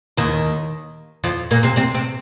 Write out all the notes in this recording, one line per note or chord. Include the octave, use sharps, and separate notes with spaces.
D#2 D#3
F2 F3
A#2 A#3
C3 C4
C3 C4
C3 C4